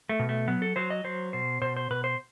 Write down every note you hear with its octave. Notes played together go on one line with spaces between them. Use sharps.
A3
B2
A3
F#3 B3
A4
F#3 C5
D#5
F#3 C5
B2 C5
B2 C5
C5
B2 B4
C5